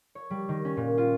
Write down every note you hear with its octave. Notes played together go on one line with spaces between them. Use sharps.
C#5
G3
D#3
C#4
A#2
F4